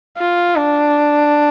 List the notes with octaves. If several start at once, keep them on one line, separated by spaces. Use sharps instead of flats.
F4
D4